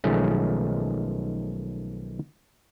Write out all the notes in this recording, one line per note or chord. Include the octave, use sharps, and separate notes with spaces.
B1 D#3 F3 G#3 A3 C#4